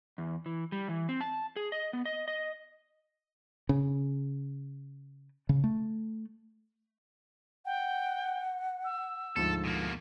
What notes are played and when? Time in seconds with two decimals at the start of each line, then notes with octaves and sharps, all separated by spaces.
0.18 E2
0.46 E3
0.72 G3
0.88 E3
1.09 C4
1.21 A5
1.56 G#4
1.72 D#5
1.93 B3
2.05 D#5
2.28 D#5
3.69 C#3
5.49 C#3
5.64 A3
7.66 F#5 G5
8.85 E6
9.36 D2 G#2 F3 A4
9.64 B2 A#3